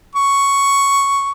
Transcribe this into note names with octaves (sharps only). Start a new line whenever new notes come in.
C#6